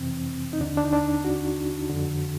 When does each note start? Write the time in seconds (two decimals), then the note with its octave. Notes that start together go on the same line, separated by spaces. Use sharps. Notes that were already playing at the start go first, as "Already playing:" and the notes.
Already playing: F2 C3 E3 C4
0.53 D#4
0.60 D#2 D3 D4
0.77 D4
0.84 D#4
0.93 D4
1.24 F#4
1.89 F2 D3